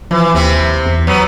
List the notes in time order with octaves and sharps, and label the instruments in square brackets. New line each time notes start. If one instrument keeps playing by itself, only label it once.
[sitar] E3 [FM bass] F3
[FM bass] D#2 [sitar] C3 C4 E4
[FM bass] E2
[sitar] F#3 B3